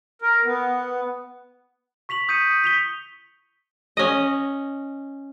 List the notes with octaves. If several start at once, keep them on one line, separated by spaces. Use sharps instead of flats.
A#4
B3
C#6 B6 F7 F#7
D#6 G6 B6 C#7 D#7
B6 F7 G7
C#4 D#5